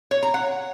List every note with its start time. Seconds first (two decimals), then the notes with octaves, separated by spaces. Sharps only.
0.11 C#5
0.23 A#5
0.34 F#5